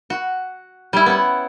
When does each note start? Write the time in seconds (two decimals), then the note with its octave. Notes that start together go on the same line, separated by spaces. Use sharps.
0.10 F#4
0.93 G3 E4
1.06 B3 C#4 F#5